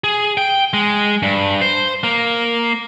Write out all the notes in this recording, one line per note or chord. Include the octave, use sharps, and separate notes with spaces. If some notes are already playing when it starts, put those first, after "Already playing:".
G#4
G5
G#3
G2
C5
A#3